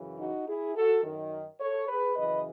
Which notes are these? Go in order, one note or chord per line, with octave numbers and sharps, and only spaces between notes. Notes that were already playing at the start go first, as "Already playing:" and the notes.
Already playing: F#2 C#3 E3
D#4 F#4
E4 G#4
F#4 A4
F#2 D#3
A4 C#5
G#4 B4
F#2 C#3 E3 B4 D#5